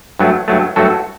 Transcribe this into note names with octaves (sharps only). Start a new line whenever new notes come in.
G2 F#3 A3
G2 F#3 A3
G2 F#3 A3 F#4 A4